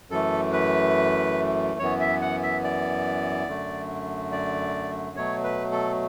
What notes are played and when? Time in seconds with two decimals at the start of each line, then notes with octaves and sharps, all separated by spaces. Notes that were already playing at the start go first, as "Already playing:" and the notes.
0.10 F#2 E3 A3 A4
0.52 B4
1.79 F#2 E3 B3 C#5
2.00 E5
2.21 F#5
2.43 E5
2.64 D5
3.48 F#2 D3 A3
4.32 D5
5.16 B2 F#3 A3 C#5
5.44 B4
5.72 A4